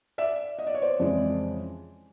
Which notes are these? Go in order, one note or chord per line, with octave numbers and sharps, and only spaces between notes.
D5 E5
D#5
D5
C#5
C5 D5
F2 C#3 E3 G#3